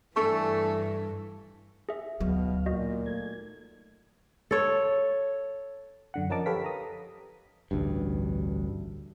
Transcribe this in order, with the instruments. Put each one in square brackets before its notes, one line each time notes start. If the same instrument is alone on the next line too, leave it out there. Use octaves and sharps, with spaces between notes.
[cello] G2 E3 [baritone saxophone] A3 [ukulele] D4 A4 G#5 [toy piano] C#6
[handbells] G#4 E5
[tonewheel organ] D2 F5 [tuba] B2 [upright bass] F#3 D#4
[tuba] A#2 [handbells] F#4 D#5
[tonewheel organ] A3 G#6
[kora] A4 C#5
[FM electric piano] F#2 D3 F#5
F3 C#4 A#4 D#5 A5 D6
G4 A4 B4 C#5 F5 B6
A#5 D#6
[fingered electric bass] A1 D2 G2